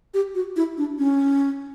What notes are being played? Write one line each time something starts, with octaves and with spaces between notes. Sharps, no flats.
G4
F#4
E4
D4
C#4